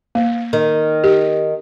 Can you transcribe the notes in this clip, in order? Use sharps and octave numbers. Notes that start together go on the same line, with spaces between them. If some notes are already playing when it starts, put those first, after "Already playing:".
A#3
D#3
G4